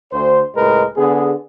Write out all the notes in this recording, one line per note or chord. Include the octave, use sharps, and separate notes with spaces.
D2 C5
C#2 A2 G#3 A#4 B4
D3 B3 G#4